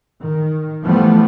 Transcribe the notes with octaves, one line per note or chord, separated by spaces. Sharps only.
D#3
E3 F3 G3 A3 B3